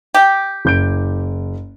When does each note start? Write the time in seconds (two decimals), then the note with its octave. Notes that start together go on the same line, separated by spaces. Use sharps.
0.14 G4
0.65 F#1 G6 D7